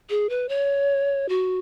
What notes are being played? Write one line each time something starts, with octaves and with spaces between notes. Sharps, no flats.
G#4
B4
C#5
F#4